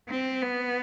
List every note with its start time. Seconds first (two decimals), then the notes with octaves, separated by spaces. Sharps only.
0.09 C4
0.41 B3